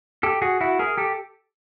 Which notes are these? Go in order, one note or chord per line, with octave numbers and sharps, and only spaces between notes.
G4 A4
F#4 G#4
E4 F#4
G#4 A#4
G4 A4